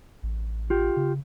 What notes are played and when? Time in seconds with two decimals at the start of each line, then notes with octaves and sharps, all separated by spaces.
0.23 A1
0.70 F4 G4
0.96 C#3